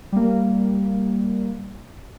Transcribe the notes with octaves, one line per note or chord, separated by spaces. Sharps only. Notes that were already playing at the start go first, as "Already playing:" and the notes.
G3 A#3